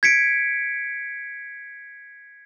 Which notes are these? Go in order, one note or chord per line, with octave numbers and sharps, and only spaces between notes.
G#6 B6 C#7 D7